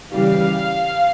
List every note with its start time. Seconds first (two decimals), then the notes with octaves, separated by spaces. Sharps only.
0.12 C#3 E3 G3 F5